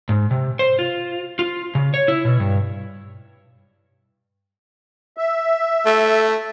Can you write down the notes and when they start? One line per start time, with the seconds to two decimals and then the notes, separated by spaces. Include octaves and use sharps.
0.09 G#2
0.31 C3
0.59 C5
0.79 F4
1.39 F4
1.75 C#3
1.94 C#5
2.08 E4
2.25 B2
2.40 G2
5.17 E5
5.86 A3